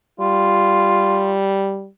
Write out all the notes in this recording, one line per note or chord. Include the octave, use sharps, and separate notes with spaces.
G3 F4